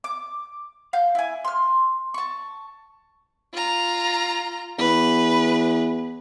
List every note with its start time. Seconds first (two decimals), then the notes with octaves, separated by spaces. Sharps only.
0.04 D6
0.93 F5 G6
1.15 E4 G#5
1.45 C6 F6
2.14 A5 C#6
3.54 F4 A#5
4.78 E2 B4